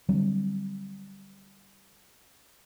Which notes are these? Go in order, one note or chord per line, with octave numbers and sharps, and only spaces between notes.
D3 F#3 G3 C4